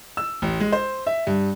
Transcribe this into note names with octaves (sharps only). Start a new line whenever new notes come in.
E6
A1
G#3
C5
E5
G2